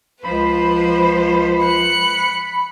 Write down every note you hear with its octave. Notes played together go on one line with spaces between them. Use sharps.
C#2 F3 B4 C5 B5
F#6 C#7